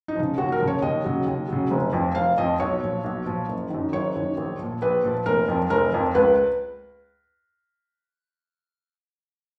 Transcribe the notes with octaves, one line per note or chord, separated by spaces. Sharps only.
D#4
C#3 F3
D#2 F#4
A#4
C#3 F3
C#5
D#2 D#5
C#3 F#3
D#2
C#3 F#3
F1
F2 F3
F1 F5
F2 F3 D#5
B1 C#5
A#2 F3
B1
A#2 F3
F#1
F#2 D#3
F#1 C#5
F#2 D#3
A#1
A#2 F3
A#1 B4
A#2 F3
F1 A#4
F2 F3
F1 A#4
F2 F3
C#2 B4